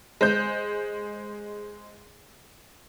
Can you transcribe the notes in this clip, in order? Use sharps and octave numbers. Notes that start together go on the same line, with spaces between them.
G#3 C5 G6